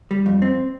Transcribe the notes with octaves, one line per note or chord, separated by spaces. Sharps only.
G3
F2
C4